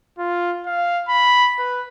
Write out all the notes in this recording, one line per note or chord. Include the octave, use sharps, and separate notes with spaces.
F4
F5
B5
B4